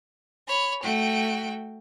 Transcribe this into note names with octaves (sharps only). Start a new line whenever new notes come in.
C#5 B5
A3 F#4 G5